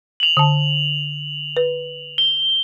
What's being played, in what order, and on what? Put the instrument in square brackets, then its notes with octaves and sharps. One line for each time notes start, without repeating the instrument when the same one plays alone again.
[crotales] F7 F#7
[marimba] D3 A5
B4
[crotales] G7